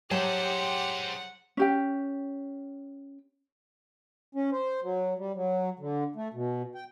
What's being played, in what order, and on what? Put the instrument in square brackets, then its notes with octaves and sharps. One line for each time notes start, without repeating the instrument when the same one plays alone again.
[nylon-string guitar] F#3 C#5 A5 [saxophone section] G4 [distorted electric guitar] G#4 C5 [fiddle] F#5
[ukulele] C#4 G4 G5
[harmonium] C#4
C5
F#3
G3
F#3
D3
A3
B2
G5